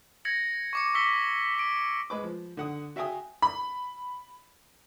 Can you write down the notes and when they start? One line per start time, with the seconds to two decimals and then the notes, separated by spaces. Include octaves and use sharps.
0.25 G#6 A#6 C#7 F#7
0.73 C#6 D6 C#7
0.94 C#6 D6 E6 B6 C#7 G7
1.55 B6 D7
2.10 G#3 B4 D6
2.23 F3
2.57 D3 F#5 D#6
2.96 F#4 E5 F5 G5 G#5 D#6
3.42 B5